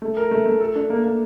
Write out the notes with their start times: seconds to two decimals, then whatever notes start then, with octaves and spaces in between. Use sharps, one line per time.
0.02 A3
0.17 A#4
0.31 A3
0.46 A3
0.61 A4
0.75 D4
0.90 A#3
1.04 A#3